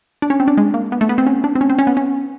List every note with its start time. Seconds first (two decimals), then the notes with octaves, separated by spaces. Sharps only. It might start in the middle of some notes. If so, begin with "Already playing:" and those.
0.22 D4
0.30 C#4
0.40 C4
0.48 D4
0.57 G#3
0.74 A#3
0.92 B3
1.01 A3
1.09 B3
1.18 C4
1.27 C#4
1.44 D4
1.55 C4
1.61 C#4
1.70 C4
1.79 C#4
1.87 B3
1.97 C#4